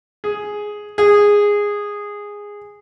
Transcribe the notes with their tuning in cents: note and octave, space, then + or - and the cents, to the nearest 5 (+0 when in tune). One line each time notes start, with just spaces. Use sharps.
G#4 +5
G#4 -10